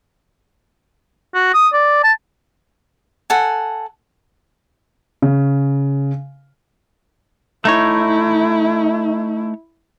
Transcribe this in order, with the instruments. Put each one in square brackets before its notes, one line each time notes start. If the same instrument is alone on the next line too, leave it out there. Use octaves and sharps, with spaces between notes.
[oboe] F#4
D#6
D5
A5
[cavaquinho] A4 F#5 G#5
[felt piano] C#3
[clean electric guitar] A3 D#4 C#5 [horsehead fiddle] E4